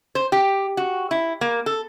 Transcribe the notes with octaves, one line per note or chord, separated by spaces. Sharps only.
C5
G4
F#4
E4
A#3
A4